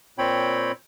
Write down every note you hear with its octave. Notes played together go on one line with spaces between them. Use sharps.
A#2 C4 C#5 G5 B5